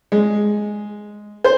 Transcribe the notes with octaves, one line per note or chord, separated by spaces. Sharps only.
G#3
C5